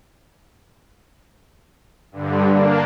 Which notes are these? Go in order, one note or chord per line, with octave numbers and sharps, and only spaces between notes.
G2 D3
A#3 D4